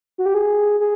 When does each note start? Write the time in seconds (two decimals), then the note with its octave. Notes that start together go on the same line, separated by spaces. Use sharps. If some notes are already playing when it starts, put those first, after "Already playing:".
0.18 F#4
0.26 G4
0.35 G#4
0.80 G#4